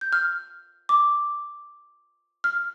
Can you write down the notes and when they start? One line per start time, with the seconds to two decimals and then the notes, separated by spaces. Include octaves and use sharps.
0.01 G6
0.13 F6
0.89 D6
2.44 F6